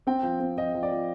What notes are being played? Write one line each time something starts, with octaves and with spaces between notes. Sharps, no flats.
C4 G5
F3
C4
F3 D#5
F3
D5
F3